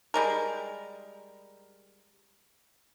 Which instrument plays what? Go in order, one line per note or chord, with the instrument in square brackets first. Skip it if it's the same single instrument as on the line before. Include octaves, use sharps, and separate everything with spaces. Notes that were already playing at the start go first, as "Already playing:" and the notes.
[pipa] G3 G#3 A#4